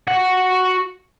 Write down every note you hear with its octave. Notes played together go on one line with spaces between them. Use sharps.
F#4 F#5